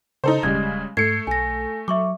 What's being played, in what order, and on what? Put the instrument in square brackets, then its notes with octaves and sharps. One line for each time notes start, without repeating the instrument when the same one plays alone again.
[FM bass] C#3 [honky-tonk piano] D#4 A4 C5
[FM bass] D1 [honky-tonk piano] C#3 G3 G#3 [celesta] G#6
[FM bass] G#2 [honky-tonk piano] A3 C#7 [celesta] G#6 C7
[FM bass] B1 [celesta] G#5 A#6
[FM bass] F#3 [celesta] E5 C#6 D6